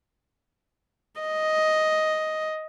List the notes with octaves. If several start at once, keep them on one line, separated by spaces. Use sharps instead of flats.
D#5